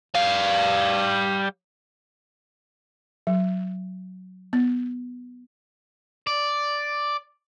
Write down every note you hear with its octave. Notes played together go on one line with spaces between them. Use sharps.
G3 F5
F#3
B3
D5